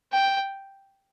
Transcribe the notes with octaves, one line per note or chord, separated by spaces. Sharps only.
G5